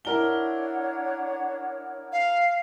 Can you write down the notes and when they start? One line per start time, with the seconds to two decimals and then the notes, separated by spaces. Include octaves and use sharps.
0.05 D4 E4 A#4 C#5 F#5 G7
2.12 F5